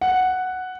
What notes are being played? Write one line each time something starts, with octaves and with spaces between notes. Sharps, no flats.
F#5